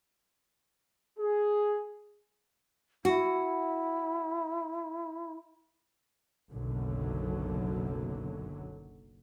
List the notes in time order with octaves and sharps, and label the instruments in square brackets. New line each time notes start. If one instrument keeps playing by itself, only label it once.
[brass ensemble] G#4
[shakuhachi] E4 [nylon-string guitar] F#4
[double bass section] F#1 B1 F#2 D3 F#3